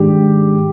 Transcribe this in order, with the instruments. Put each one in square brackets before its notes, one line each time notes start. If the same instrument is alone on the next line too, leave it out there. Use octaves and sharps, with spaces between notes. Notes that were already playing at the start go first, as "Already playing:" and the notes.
Already playing: [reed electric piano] G#2 D#3 G#3 D4 [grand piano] G4